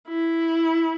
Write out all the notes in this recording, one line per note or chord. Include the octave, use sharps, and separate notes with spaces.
E4